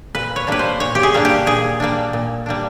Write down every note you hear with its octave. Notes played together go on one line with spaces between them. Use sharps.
A#2 B4
C#5
G3 A#3 D4 B4
C5
A#2 C#5
G4
G#4
G3 A#3 D4
G4
A#2 G#4
G3 A#3 D4
A#2
G3 A#3 D4